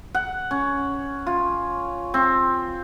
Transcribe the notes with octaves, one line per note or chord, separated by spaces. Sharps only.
F#5
C#4
F4
C4